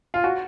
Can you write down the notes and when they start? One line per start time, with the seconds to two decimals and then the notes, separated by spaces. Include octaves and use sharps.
0.14 F4
0.24 F#4